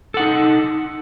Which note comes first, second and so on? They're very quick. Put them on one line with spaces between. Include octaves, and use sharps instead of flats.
A4 F#5 D#4